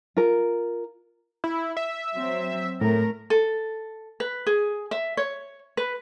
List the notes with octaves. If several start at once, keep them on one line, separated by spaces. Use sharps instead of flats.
F4 A#4
E4
E5
F#3 C4
A2 A3 A#4
A4
B4
G#4
E5
C#5
B4